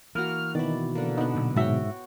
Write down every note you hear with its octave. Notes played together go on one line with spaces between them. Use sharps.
E3 A#3 F#4 F6
B2 D#3 E4 D5
D3 A#3
B3 D4 D#4
A#2 D3 F#3
G#2 F#4 C#5 E5 G5